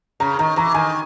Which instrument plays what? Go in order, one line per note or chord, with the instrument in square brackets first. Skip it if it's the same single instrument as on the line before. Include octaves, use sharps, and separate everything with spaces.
[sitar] C#3 [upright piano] A#5
[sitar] D#3 [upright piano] A#5
[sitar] E3 [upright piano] A#5
[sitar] D#3 [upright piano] G#5